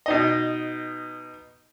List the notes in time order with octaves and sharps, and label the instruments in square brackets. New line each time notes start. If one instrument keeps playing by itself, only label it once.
[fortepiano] B2 D#4 D#5